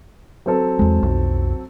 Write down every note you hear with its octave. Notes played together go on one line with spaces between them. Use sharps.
F#3 C4 A4
E2 G#3
B1 F2